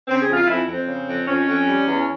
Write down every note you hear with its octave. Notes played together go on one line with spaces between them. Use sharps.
C#3 C4
G#4
F2
F4
F2 E4
F2
C4
C#3
F2
F2 C#4
F2
G3
E2